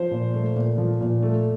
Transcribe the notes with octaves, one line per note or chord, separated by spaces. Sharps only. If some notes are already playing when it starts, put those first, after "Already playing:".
Already playing: F3 C5
A#2
A3
A#2
F3
A#2
A3